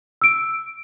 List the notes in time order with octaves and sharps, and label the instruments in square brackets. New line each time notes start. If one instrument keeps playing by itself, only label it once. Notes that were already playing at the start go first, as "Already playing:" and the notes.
[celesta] E6 D7